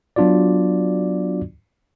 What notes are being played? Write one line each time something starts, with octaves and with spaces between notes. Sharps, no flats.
F#3 B3 D4 F4 F#4 D5